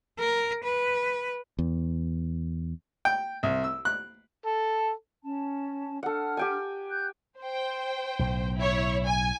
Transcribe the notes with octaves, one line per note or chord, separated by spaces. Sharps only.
A#4
B4
E2
G5
C2
E6
F#6
A4
C#4 A5
D4 A4 F#5 F6
G4 G5 G#5
F#6 G6
C5 G5
B1 A2
E4 C#5
G#5